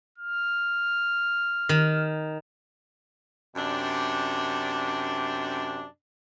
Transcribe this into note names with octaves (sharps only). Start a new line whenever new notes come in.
F6
D#3
F#2 C3 D4